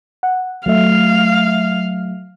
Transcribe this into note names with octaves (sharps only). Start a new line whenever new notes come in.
F#5
F#3 A3 E5 F5